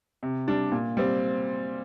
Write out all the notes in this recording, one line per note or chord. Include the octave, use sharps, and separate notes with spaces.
C3
G3 D4
A#2
G3 C4